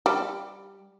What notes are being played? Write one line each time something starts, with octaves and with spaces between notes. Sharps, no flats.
G3 G4